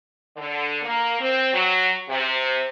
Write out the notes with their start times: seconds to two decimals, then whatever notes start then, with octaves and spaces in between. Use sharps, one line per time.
0.36 D3
0.82 A#3
1.19 C4
1.52 F#3
2.09 C3